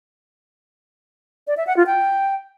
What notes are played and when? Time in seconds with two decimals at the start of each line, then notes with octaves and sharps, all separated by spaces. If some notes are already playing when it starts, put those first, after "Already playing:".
1.47 D5
1.57 E5
1.67 F#5
1.77 F4
1.87 G5